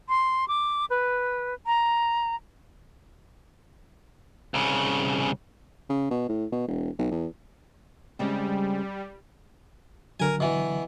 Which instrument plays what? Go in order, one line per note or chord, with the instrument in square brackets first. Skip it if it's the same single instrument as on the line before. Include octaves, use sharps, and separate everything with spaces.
[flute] C6
D6
B4
A#5
[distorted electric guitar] C2 C#3
[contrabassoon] C#3
B2
A2
B2
E1
B1
E2
[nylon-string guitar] C#3 G#3 C4 [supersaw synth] G3
[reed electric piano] D3 F#3 [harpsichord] A#4 G#5
[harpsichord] B2 E3